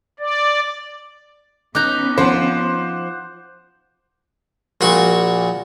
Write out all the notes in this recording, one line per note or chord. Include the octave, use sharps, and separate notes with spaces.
D5
B3 C#4 D#4 A#5 D6 F#6 G6
F3 C5 F#5
A#1 A#2 F#4 C#6